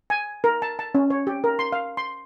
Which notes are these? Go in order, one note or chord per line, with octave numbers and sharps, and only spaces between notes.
G#5
A#4
A5
A5
C#4
C#5
G4
A#4
C6
F5
C6